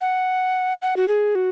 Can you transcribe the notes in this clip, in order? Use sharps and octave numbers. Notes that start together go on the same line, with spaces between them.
F#5
F#5
F#4
G#4
F#4